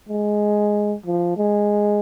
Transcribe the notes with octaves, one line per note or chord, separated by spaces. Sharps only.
G#3
F3
G#3